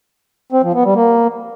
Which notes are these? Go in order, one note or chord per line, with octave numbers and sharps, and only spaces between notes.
C4
F3
B3
G3
A#3